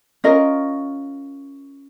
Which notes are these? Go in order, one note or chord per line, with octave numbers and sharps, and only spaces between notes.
C#4 F4 A#4 D#5